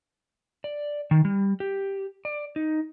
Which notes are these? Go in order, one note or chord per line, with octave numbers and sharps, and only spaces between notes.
D5
D#3
G3
G4
D5
D#4